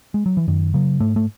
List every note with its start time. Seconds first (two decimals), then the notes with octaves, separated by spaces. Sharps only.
0.14 G#3
0.26 F#3
0.37 E3
0.48 F#2 D#3
0.74 C#3 F#3
1.00 G#2 A3
1.16 A3